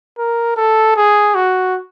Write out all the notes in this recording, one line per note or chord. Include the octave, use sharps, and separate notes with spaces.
A#4
A4
G#4
F#4